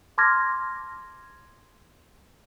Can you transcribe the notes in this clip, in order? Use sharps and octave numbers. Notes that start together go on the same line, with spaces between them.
A5 C6 D6 F6 G#6 A#6